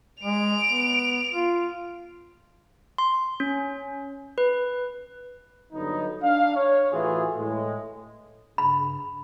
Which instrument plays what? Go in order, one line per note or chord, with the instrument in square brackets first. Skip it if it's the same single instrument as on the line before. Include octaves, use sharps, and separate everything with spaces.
[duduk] G#3 [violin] D7 F7
[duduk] B3
F4
[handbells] C6
C#4
B4
[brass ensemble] G2 D3 F#3 B3 D#4
D4 F5
C#5
A2 E3 A3 F4 F#4 G#4
A2 G#3
[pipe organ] G2 C#3 [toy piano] B5